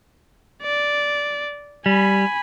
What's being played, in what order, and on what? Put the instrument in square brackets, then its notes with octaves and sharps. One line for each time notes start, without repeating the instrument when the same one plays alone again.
[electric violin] D5
[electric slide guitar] G3 [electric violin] G#5 B5